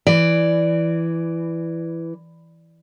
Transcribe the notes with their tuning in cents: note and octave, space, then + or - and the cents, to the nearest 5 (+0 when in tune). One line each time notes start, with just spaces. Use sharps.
E3 +10 D5 +0